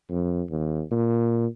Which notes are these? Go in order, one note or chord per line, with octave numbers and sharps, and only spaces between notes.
F2
D#2
A#2